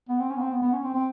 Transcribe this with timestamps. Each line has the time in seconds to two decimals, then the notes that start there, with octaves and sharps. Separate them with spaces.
0.09 B3
0.20 C4
0.30 C#4
0.37 B3
0.41 C4
0.52 B3
0.62 B3
0.73 C#4
0.84 C4
0.94 C4